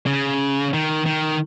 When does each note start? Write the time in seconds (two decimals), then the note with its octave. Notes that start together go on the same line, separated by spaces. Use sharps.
0.06 C#3
0.74 D#3
1.06 D#3